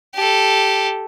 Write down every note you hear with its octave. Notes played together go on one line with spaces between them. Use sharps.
G4 A4